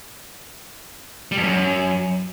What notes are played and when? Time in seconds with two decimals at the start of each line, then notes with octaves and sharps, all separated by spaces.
1.32 G3
1.37 F2
1.43 F#2